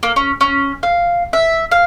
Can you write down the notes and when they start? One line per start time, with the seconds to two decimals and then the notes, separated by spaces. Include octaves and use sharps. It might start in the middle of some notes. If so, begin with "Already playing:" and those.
0.03 A#3
0.16 C#4
0.41 C#4
0.83 F5
1.33 E5
1.71 F5